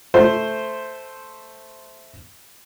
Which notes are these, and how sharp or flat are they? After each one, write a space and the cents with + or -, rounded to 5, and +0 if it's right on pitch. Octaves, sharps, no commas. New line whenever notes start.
A3 +0 C5 +0